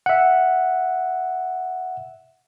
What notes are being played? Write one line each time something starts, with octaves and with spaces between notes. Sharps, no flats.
E5 F#5